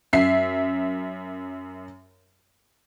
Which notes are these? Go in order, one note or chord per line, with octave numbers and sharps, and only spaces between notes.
F#2 E5 C7